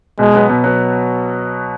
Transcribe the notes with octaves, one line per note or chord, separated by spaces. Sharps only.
B2 G#3
F#3 B3
B2
F#3 B3